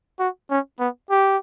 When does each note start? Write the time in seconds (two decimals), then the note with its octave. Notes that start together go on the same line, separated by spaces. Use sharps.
0.19 F#4
0.50 C#4
0.80 B3
1.10 G4